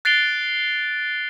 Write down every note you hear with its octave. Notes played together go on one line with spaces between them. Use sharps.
F#6 A6 C7 D7 F7 G7